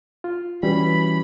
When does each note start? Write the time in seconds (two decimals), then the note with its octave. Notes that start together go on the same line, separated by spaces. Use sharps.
0.24 F4
0.63 E3 G3 C#4 F#4 B4 B5